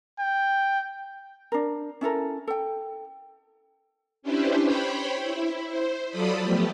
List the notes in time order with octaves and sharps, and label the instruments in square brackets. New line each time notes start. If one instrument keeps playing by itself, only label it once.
[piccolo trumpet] G5
[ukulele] D4 A#4
C#4 E4 A4 A#4
A4 G5
[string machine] C#4 D4 E4 G4 B4 C5
C5 C#5 G5 B5
E4
C5
F#3 F4 A4 D5 B5 D#6
F3 A3 B3 G4